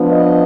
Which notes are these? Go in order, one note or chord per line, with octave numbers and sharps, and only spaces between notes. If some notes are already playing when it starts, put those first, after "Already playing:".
Already playing: F3 B3 D4
D#5